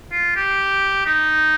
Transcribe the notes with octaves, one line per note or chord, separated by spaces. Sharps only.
F4
G4
D#4